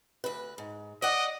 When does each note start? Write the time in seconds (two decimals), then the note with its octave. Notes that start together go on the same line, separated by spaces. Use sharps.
0.24 D2 B4
0.58 G#2
1.02 D5 D#5 F#5